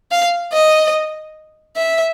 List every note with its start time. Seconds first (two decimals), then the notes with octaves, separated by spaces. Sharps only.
0.11 F5
0.53 D#5
1.76 E5